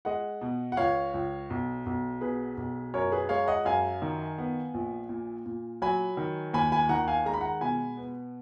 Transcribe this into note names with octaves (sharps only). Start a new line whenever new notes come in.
G#3 D#5 F#5
B2
F#5
C#2 C#5 F5
C#2
B1
B1
B2 G#4 B4
B1
F#2 A#4 C#5
G#4 B4
G#3 C#5 F5
D#5 F#5
F#2 F5 G#5
D#3
B3
A#1
A#2
A#2
F#3 G#5 B5
D#3
D#2 G#5 B5
G#5 B5
D#3 F#5 A#5
F5 G#5
G#3 A#5
B5
F#5 A#5
B2 G#5 B5
B3